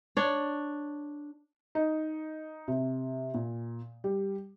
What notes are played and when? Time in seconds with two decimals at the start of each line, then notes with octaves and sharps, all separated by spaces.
0.17 D4 C#5
1.75 D#4
2.68 C3
3.34 A#2
4.04 G3